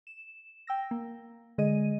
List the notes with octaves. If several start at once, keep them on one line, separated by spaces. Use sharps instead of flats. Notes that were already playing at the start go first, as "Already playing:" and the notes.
E7
G5 E6 A#6
A#3
D3 G#3 G#4 D#5 D#7